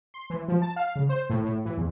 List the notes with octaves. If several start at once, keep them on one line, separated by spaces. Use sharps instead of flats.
C6
E3
F3
A5
F5
C#3
C5
A2
A2
E3
E2